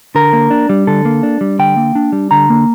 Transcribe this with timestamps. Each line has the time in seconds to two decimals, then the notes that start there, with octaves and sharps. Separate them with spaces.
0.15 D3 A#4
0.33 A#3
0.51 D4
0.69 G3
0.87 D3 A4
1.05 A#3
1.23 D4
1.41 G3
1.59 D3 G5
1.76 A#3
1.95 D4
2.12 G3
2.31 D3 A#5
2.50 A#3